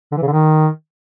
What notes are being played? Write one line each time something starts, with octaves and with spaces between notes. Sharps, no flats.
D3
E3
C#3
D3
D#3